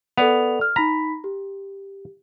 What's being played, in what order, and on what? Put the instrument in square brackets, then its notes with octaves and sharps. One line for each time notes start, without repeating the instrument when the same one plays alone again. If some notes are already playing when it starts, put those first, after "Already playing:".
[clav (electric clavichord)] B3 [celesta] A4 D5 F7
[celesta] F6
[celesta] D#4 B5 B6 [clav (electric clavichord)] A#5
[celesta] G4